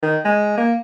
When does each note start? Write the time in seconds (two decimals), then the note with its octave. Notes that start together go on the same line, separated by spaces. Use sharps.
0.02 D#3
0.25 G#3
0.58 A#3